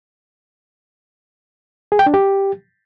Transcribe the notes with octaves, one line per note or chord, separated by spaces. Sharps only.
G#4
G5
D4
G4